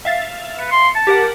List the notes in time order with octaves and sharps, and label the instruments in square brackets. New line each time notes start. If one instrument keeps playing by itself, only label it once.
[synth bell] E5 F5 A6
[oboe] B4 [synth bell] C#7
[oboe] C6
A5
[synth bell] G4 A#4 F#5